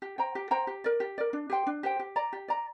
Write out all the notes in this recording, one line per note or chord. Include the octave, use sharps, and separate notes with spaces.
G4
C5 G5 A#5
G4
C5 G5 A#5
G4
A#4 D5
G4
A#4 D5
D4
G4 C5 G5
D4
G4 C5 G5
G4
D5 A#5
G4
D5 A#5